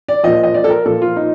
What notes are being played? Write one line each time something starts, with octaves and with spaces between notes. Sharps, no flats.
D5
A#2 F3 D#5
D#5
D5
A4
A#4
A#2 F3 A4
F4
D#4